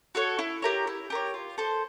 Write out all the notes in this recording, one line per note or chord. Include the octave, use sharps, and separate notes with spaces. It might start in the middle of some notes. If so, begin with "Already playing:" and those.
F#4 A4 C#5
E4
G4 A#4 C#5
E4
G4 A#4 C#5
F4
A4 C5